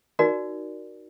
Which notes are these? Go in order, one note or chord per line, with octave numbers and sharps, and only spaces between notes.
D#4 F#4 A#4 D5